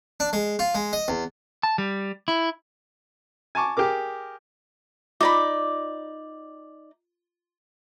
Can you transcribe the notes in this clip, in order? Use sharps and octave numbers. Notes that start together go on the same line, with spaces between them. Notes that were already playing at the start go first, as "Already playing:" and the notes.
D4
G#3
F4
G#3
D#5
E2
A5
G3
E4
G#5 A5 C#6 D6
G4 G#4 A#4 D6
D#4 F4 D5 B5 D6